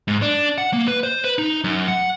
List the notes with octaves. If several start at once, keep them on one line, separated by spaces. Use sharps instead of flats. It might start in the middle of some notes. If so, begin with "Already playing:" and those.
G#2
D4
F#5
A#3
B4
C5
B4
D#4
F#2
F#5